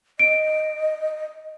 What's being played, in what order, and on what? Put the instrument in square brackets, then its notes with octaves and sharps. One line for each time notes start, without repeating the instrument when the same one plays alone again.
[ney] D#5 [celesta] D7